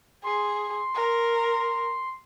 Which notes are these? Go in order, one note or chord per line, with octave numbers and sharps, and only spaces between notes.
G#4 C6
A#4